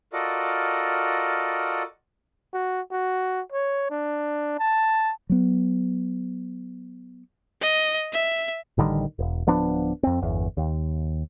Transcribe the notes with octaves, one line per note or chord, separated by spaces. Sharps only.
F4 F#4 A4 A#4 D5 D#5
F#4
F#4
C#5
D4
A5
F#3 B3
D#5
E5
A1 D3 D#3 G3
E1
D1 F3 B3 D4
F2 C4
G1 E2
D#2